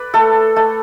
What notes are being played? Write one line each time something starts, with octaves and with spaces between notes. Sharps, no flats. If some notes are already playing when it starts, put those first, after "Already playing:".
Already playing: B4 D5
A3 A4
A3